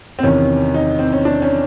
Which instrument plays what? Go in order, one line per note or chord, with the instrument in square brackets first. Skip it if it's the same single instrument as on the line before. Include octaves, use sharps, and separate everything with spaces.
[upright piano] C4
E2 C3 D#3 C#4
D#4
C4
C#4
D4
C#4